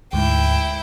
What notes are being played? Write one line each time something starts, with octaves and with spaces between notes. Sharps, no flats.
D2 G#2 E4 G5